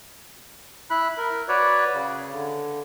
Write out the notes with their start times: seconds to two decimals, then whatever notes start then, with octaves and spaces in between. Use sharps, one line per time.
0.90 E4 B5 F#6
1.18 A#4
1.49 F#4 B4 C#5 D5
1.94 C#3
2.32 D3